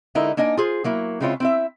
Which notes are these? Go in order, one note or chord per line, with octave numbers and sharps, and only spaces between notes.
D3 G#3 D#4 E4 A#4
A#3 D4 D#4 D#5 G#5
F4 G#4 C5
F#3 A#3 E4
C#3 G#3 C4 E4 F4 C#5
C4 E4 E5